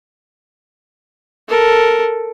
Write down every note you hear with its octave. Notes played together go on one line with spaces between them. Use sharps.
A4 A#4